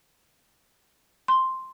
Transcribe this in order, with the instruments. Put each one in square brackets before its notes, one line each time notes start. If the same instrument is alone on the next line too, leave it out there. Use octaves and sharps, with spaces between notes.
[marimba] C6